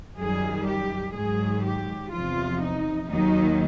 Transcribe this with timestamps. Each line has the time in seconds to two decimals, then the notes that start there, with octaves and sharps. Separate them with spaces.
0.17 F#2 D#3 G3 G#4
0.66 G4
1.15 G#2 D#3 F#3 G#4
1.64 G4
2.12 E2 C3 F3 F4
2.61 D#4
3.10 D#2 D#3 F#3 D#4